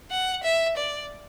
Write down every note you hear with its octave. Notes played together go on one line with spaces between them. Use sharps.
F#5
E5
D5